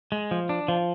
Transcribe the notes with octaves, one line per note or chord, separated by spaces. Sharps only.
G#3
F3
D4
F3